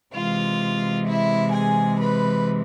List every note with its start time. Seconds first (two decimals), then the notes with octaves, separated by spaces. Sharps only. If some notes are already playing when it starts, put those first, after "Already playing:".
0.13 C3 E3 G#3 F4 F5
1.06 E4 E5
1.53 G#4 G#5
1.99 B4 B5